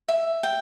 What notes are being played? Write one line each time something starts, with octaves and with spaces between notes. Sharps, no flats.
E5
G5